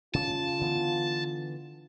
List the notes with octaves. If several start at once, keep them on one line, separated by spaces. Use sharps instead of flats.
C#3 F4 A5
D3 E3 B3